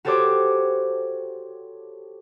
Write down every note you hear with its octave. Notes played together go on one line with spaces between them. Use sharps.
F#4 G4 A4 C5 C#5 D6